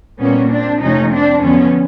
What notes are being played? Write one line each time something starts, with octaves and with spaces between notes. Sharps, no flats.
A#2 G3 A#3 B3 C#4
C4 D4
F2 C3 F3 A3 C#4 D#4
C4 D4
F2 D3 F#3 B3 C#4